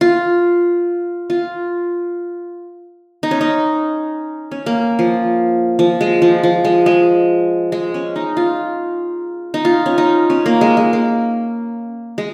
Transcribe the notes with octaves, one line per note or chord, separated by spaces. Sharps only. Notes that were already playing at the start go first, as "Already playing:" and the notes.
F4
F4
D#4
C#4
D#4
C#4
A#3
F3
F3
G#3
F3
F3
G#3
G#3
G#3
C#4
D#4
F4
D#4
F4
C#4
D#4
C#4
A#3
G#3
G#3
A#3
G#3